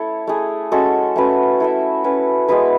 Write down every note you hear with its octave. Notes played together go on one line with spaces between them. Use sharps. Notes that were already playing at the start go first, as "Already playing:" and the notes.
Already playing: A3 E4 A4 C#5
A3 E4 G#4
G#3 C#4 F#4 A4
A3 C#4 F#4 B4
E4 A4 E5
C#4 F#4 B4
G#3 B3 E4 B4